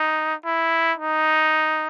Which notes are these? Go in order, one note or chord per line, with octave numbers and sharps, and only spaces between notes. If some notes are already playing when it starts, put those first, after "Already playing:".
Already playing: D#4
E4
D#4